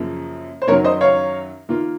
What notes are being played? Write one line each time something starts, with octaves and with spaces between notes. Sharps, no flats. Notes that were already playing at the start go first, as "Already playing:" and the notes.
Already playing: F#2 C#3 F3 A#3
C5
F#2 D#3 F#3 A#4 C#5
C5 D#5
C#5 F5
D#3 A#3 F4